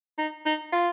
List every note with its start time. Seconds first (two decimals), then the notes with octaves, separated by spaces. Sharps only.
0.18 D#4
0.46 D#4
0.73 F4